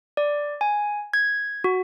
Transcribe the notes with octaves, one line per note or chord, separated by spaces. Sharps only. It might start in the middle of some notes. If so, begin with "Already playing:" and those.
D5
G#5
G#6
F#4